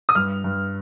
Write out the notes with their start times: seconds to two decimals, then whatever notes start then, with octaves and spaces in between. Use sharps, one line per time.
0.09 D#6
0.15 G2 F6
0.44 G2